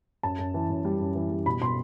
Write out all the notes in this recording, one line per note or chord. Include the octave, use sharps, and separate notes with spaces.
F#2 A5
F#2
E3
F#2
G3
F#2
E3
G3
B2 B5
B2 C6